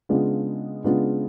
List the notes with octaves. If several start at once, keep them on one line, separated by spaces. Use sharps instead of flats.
C#3 G#3 B3 D4 F4
C#3 G#3 B3 D4 F4